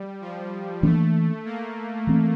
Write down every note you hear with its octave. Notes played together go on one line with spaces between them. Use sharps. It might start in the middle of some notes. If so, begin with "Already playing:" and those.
Already playing: G3
F3
E3 A3 A#3 D4
A#3
E3 A3 C4